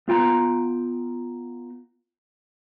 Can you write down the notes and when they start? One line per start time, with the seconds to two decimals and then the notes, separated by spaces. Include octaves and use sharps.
0.08 B3 F4 G5 A#5